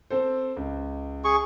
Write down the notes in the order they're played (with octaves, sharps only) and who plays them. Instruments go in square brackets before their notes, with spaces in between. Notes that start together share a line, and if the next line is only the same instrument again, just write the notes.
[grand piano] C4 A4 C5
C#2
[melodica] G#4 C#6